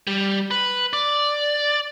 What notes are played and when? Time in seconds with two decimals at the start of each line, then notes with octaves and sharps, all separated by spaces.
0.07 G3
0.51 B4
0.93 D5